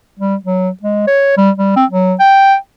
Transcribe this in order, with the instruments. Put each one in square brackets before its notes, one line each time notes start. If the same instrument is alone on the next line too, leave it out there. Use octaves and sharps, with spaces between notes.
[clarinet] G3
F#3
G#3
C#5
G3
G3
C4
F#3
G5